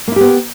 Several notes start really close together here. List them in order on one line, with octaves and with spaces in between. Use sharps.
A#3 E4 G4 B3